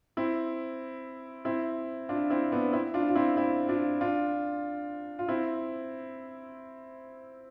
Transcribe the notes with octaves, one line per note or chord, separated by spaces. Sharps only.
C4 E4
C4 E4
D4 F4
C4 E4
B3 D4
C4 E4
D4 F4
F4
C4 E4
C4 E4
D4 F4
D4 F4
F4
C4 E4